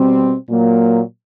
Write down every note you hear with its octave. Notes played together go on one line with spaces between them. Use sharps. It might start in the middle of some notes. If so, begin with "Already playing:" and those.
Already playing: B2 G3 C4
A#2 F#3 A#3